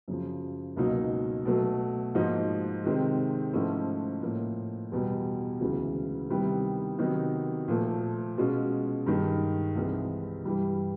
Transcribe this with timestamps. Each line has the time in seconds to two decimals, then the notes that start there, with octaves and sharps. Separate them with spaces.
0.08 F#2 C#3 F3
0.77 C#2 B2 F#3 A#3 D#4
1.45 B2 F#3 A3
2.15 G#2 F3 A#3 D#4 F#4
2.84 C3 D#3 G#3 C4
3.53 G#2 F3 A3 C#4 E4
4.22 A2 F3 A#3
4.92 E2 B2 G3
5.61 D2 C#3 E3 G#3
6.30 C3 D#3 G3 B3 E4
6.99 C3 D#3 F#3 B3 D#4
7.68 A#2 F3 A3
8.38 B2 G#3 C#4 F4
9.06 G2 D#3 G#3
9.76 C2 C3 E3 G#3
10.45 G2 E3 G3